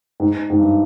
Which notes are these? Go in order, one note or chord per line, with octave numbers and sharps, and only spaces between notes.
G#2
G#2
G2